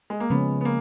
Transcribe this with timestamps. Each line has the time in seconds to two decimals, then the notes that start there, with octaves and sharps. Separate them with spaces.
0.10 G#3
0.20 A#3
0.30 C#3 F3 G#3 B3 C#4
0.61 B3
0.65 A#3